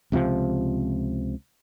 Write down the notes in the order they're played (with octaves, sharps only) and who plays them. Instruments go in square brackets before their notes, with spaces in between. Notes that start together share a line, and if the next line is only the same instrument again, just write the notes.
[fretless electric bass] C#2 C3 E3 F3